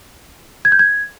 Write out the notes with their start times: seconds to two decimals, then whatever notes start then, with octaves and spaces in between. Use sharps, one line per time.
0.65 G#6
0.72 G6
0.79 G#6